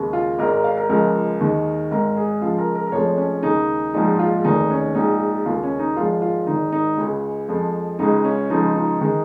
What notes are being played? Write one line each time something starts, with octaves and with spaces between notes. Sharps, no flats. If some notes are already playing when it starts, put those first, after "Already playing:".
Already playing: D#2 C#3 G#3
F4
G#1 G#2 G#3 A#4
A#4
F5
A#4
C#2 C#3 F3 G#3 A#4
D#2 D#3 G#3
G#1 G#2 G#3 A#4
G#4
C#2 C#3 F3 G#3 F4
A#4
A#4
A#4
F1 F2 F3 G#3 C#5
C#4
D#2 C#3 G#3 D#4
A#1 G#2 F3 G#3 D#4
F4
F1 D#2 D#3 G#3 D#4
C#4
A#1 G#2 G#3 D#4
D#2 C#3 G#3 F4
C#4
D#4
G#1 G#2 F3 G#3 F4
F4
G#1 G#2 D#3 G#3 D#4
D#4
C#2 C#3 G#3
F2 F3 G#3
C#2 C#3 G#3 D#4
C#4
C#2 C#3 F3 D#4
D#4
D#3 G#3 D#4